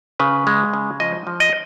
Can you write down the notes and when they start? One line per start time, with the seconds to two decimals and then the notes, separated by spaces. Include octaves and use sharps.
0.20 C#3 B4
0.47 G#3
0.74 C#3
1.00 F3 D#5
1.27 F3
1.40 D#5